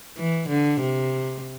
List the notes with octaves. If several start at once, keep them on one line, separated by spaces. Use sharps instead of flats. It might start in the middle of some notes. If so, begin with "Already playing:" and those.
E3
D3
C3